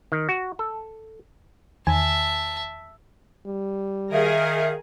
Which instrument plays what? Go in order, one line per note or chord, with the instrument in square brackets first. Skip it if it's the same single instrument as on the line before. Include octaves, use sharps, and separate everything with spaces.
[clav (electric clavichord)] D#3
F#4
A4
[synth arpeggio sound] E2 D#3 G#5 [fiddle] E5 A5
[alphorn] G3
[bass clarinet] D#3 [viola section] G#4 A#4 G#5 [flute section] E5 F5